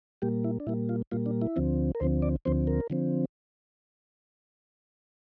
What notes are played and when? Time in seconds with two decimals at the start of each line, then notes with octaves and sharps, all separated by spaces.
0.22 A#2 G3 A#3 G4
0.44 E4
0.60 D4
0.67 A#2 G3 A#3 E4
0.89 F4
1.12 A#2 G3 A#3 F4
1.26 D4
1.42 E4
1.56 D2 D3 F3 C4
1.95 A#4
2.00 D2 D3 F3 C4 C5
2.22 D5
2.45 D2 D3 F3 C4 C5
2.67 A#4
2.90 D3 F3 C4